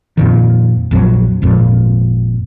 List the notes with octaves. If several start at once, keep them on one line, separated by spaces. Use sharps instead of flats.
F2 A#2 D#3
A#1 F2 E3 F#3
G#1 F2 A#2